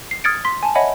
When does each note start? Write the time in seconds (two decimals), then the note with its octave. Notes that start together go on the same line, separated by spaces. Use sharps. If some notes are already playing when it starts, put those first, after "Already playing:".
0.11 C7
0.24 D#6 F6 G#6 A6 C#7 D7
0.45 C6 B6
0.63 G#5 A5
0.75 C#5 D#5 E5 F#5 G#5 B5